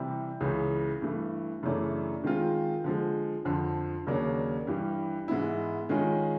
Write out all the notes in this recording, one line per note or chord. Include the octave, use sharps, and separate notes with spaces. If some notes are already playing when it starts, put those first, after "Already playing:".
Already playing: C3 E3 G3 C4
C#2 C#3 E3
G2 E3 A3
F#2 C#3 E3 A3 D4
D#3 G#3 C4 F4
D3 F3 G#3
F2 D3 F3
D#2 C#3 F#3 A#3 D4
G2 E3 G3
G#2 E3 G#3 B3 E4
D#3 G#3 C#4 F4 G#4